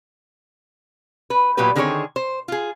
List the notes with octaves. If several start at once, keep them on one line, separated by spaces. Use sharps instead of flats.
B4
A#2 F#3 B3 G4 B4
D3 D#3 C4 G#4 A4 C#5
C5
F4 G#4